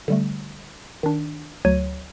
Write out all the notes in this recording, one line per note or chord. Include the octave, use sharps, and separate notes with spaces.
D3 G3 A3
D#3 D4
D2 F#3 C#5 G#6 D#7